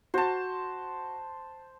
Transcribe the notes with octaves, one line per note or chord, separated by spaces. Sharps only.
F#4 C5 A5